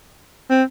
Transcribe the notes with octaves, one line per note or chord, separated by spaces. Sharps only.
C4